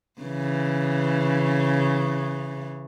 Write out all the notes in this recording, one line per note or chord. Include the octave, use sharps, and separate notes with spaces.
C#3 E3